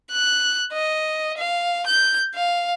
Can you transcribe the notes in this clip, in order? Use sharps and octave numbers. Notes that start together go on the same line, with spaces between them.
F#6
D#5
F5
G6
F5